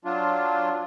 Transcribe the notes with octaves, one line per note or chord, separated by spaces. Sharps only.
F#3 D4 F4